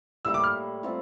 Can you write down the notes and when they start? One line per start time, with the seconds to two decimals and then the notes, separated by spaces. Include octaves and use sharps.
0.25 A2 G3 A#3 E4 E6
0.34 D6
0.44 F6
0.83 A2 G3 C4 F4